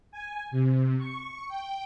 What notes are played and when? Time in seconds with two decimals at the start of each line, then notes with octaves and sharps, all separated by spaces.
0.11 G#5
0.51 C3
0.98 C#6
1.48 G5